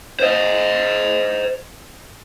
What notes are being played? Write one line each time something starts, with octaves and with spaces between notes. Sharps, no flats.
C5 D#5